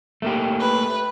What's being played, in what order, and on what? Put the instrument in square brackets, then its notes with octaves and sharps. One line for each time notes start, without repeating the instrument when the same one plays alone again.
[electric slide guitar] A3 A#3 G4
[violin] B4